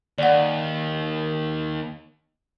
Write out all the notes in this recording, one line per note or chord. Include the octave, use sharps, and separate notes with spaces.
D#2 D5 F#5